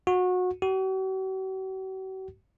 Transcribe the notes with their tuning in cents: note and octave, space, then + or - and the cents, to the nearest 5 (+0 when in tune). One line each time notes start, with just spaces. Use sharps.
F#4 -25
F#4 +45